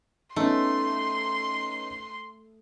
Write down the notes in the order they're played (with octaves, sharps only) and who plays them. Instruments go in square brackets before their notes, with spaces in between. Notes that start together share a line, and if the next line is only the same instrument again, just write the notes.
[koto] A3 [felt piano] B3 C#4 D#4 [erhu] C6